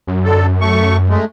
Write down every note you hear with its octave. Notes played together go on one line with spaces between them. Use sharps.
F#2
D3 A4
A3 C#6
G#3 A3